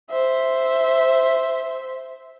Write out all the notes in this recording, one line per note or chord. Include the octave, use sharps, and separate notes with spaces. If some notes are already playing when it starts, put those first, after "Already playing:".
C5 E5